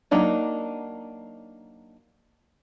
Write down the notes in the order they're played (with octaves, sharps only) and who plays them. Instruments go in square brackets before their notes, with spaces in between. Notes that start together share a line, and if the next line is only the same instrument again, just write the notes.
[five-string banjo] F#3 A#3 D4 D#4